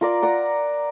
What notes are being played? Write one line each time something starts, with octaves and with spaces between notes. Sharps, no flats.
F4 A#4 D5
D5 F#5 A#5